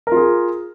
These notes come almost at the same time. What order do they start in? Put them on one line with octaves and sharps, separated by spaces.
A#4 F4 G#4